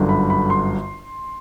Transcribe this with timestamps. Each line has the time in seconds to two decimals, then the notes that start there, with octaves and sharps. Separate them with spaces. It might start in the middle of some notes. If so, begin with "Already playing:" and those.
Already playing: G1 F#2 D3
0.09 B5
0.30 B5
0.50 C6